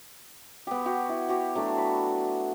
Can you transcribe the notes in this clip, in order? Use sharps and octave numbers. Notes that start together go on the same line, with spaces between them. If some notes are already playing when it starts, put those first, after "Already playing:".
B3 G4
F#4 G4
E4
F#4 G4
F#3 A3 D4
B5